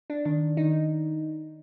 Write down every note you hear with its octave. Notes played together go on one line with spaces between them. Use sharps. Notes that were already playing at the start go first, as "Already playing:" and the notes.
D4
D#3 D4
D#3 D#4